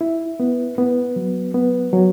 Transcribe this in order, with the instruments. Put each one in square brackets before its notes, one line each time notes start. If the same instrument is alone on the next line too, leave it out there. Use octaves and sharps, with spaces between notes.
[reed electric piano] E4
B3
B3
F#3
B3
F#3